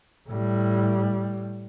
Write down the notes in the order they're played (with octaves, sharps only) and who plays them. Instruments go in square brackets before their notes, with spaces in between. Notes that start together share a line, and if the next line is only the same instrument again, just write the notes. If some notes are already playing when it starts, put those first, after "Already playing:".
[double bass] A2 G3